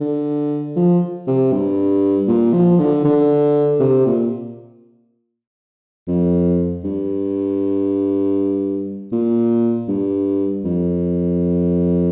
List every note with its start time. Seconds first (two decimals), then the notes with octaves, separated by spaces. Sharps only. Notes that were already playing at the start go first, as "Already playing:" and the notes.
0.01 D3
0.76 F3
1.27 C3
1.52 G2
2.28 A#2
2.54 F3
2.79 D3
3.05 D3
3.80 C3
4.06 A#2
6.08 F2
6.84 G2
9.12 A#2
9.88 G2
10.65 F2